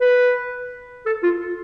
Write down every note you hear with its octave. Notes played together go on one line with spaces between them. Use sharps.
B4
A4
F4